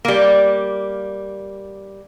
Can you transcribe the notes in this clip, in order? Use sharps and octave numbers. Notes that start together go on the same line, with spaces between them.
G3 A#3